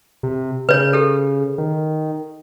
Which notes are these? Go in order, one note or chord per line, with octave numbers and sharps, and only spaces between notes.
C3
C#3 B4 C#5
G4 A4
D#3